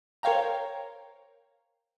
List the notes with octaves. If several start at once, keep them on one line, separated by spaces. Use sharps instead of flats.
A#4 C5 C#5 F5 G5 A#5